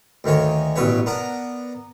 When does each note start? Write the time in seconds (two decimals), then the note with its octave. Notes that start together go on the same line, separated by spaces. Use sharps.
0.24 D2 D#3 A#3 C#5 G#5
0.76 A1 G2 B2 B4 C#5
1.06 B3 D4 A#4 A#5